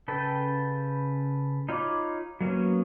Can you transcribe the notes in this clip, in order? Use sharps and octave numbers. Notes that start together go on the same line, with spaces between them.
C#3 A4 B4 G5
D#4 F4 C#5 B5 D6
F#3 A#3 B3 C#4